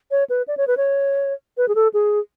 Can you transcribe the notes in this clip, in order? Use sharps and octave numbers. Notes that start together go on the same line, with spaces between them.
C#5
B4
D5
C#5
B4
C#5
B4
G#4
A4
G#4